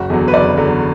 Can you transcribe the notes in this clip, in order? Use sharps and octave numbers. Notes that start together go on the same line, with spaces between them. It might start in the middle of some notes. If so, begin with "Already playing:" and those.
Already playing: F#1 F#4
E2 D3 F#3
B4
F#1 D5
E2 D3 F#3